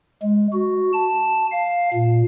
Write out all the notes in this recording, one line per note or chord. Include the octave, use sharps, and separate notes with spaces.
G#3
F#4
A5
F5
A#2